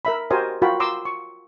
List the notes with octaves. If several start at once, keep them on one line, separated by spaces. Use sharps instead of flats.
A#4 E5 B5
F#4 G4 A#4 C5 D#5 G#5
F4 F#4 A#4 F5 G5 B5
A#5 C6 D6 E6
C#6